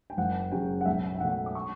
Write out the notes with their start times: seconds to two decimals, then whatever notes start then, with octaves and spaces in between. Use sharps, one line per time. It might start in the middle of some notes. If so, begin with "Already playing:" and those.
0.10 G5
0.17 F#1 F#5
0.52 F#2 C#3 F#3 G5
0.81 F#5
0.86 B1 E5
1.15 G5
1.20 B2 F#3 A3 F#5
1.46 D6
1.55 C#6